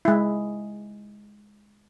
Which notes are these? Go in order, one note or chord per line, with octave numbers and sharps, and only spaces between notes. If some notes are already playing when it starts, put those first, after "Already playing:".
G#3 E4